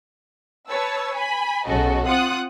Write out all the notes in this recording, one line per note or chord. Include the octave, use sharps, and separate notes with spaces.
B4 C#5 A5 E6
G#5 B5
B1 C#3 F#4 A4 D#5
C4 F4 F#5 D#6 F#6